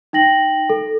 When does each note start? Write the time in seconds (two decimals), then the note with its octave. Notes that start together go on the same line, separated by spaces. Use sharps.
0.13 D#4 G5 A#6 F#7
0.70 A4